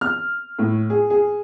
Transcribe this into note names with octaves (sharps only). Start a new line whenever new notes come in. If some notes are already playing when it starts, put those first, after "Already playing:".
F6
A2
G#4
G#4